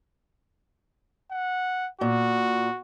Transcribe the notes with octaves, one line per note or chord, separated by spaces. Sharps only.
F#5
A#2 F#4